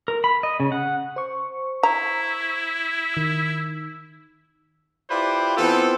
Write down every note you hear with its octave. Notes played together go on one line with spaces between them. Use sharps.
A#4
B5
D#5
C#3
F#5
C5 C#6
E4 A#5
D#3 E6
E4 F4 G4 B4 C5 D5
E3 B3 C4 F4 A4